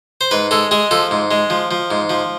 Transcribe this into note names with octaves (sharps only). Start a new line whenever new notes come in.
C5
G#2 B4
G#3 A4
G#3 G#4
F3 A4
G#2
G#3
F3
F3
G#2
F3